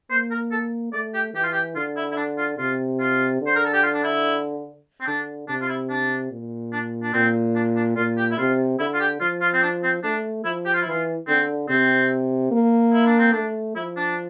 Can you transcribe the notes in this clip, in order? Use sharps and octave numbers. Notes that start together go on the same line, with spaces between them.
A#3 C5
A#4
A4
A3 D5
G4
E3 G4
F4
G4
D3 F4
E4
E4
D4
F4
C3 F4
F4
D3
C5
A#4
A4
G4
F4
D4
E4
C4
D3 D4
C3 D4
F4
E4
D4
A#2
D4
D4
A#2 C4
D4
D4
A#2 F4
G4
E4
C3 F4
D3 E4
F4
G4
F3 F4
F4
C4
D4
C4
A3 D4
F3 E4
G4
F4
E4
E3 F4
D3 C4
C3 C4
A#3
E4
D4
C4
A3 D4
F3 E4
D4